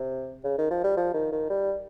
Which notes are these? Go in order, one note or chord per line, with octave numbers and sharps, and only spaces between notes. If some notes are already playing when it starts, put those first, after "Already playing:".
Already playing: C3
C#3
D#3
F3
G3
F3
D#3
D#3
G3